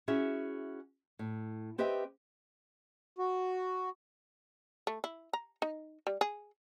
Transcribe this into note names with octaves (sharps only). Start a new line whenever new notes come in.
C#4 E4 F#4 G#4 E5
A2
C4 G4 B4 D#5 E5 G5
F#4
A3
E4
A#5
D#4
G3
G#4